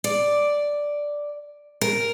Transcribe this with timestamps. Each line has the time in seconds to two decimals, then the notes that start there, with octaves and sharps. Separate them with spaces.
0.04 D5
1.81 A#4